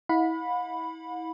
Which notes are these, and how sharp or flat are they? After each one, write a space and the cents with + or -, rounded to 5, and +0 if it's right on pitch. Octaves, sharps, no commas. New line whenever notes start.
E4 -30 F#5 -45 B5 +0